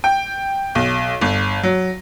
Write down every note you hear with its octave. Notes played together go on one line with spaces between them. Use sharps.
G5
B1
G1
F#3